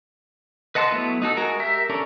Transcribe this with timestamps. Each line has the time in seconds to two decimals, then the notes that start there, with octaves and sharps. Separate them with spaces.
0.75 B4 D#5 F#5 A5 C6
0.91 F#3 A3 B3 E4
1.22 D#4 F#4 A4
1.37 G#3 F#4 A#4
1.59 G4 A#4 E5
1.89 C#4 D4 A4 A#4